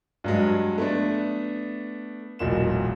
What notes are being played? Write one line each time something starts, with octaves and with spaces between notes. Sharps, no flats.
G2 F#3 G#3
A3 B3 D4
E1 B1 A#2 E7